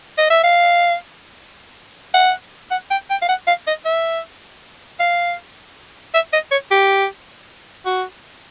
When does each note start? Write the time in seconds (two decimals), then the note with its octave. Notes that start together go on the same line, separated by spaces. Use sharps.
0.18 D#5
0.30 E5
0.44 F5
2.14 F#5
2.71 F#5
2.91 G5
3.10 G5
3.22 F5
3.29 F#5
3.47 F5
3.67 D#5
3.85 E5
5.00 F5
6.14 E5
6.33 D#5
6.51 C#5
6.71 G4
7.86 F#4